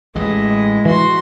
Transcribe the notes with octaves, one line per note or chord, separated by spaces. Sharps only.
A1 A2 E3 G#3 E4 D#5
E3 F#4 C6